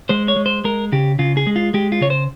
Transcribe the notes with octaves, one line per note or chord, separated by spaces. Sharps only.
G#3 C5
C#5
G#3
C5
G#3 A#4
C#3 G4
C#3 F4
G#4
G#3
F4
G#3 G4
F4
C#3 C#5
C5